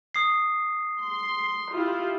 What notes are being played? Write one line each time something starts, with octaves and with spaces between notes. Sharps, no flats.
D#6 C7
C6
E4 F4 G4